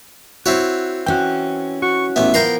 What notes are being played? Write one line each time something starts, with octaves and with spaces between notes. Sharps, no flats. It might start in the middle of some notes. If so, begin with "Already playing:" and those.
C4 E4 F#4 C#5
E3 C#4 F#4 G5
F#4 C#6
A1 B3 E5
F3 A#3 B3 G5 A#5 C6